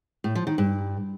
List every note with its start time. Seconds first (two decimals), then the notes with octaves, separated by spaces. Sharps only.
0.24 A2
0.35 F3
0.47 D#3
0.58 G2